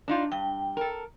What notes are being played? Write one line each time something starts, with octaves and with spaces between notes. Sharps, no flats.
D4 D#4 F4
G2 G5
A4 A#4